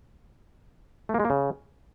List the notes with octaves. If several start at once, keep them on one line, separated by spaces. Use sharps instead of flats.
A3
A#3
G#3
A#3
C#3